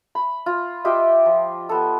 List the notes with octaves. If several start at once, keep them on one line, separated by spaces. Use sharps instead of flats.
B5
F4
F4 G4 D#5 E5
F3
B3 A4